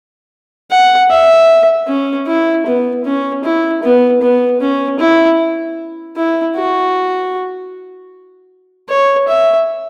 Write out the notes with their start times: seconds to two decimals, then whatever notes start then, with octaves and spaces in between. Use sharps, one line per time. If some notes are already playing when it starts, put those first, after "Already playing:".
0.71 F#5
1.10 E5
1.88 C#4
2.27 E4
2.66 B3
3.05 C#4
3.44 E4
3.83 B3
4.22 B3
4.61 C#4
5.00 E4
6.16 E4
6.56 F#4
8.89 C#5
9.28 E5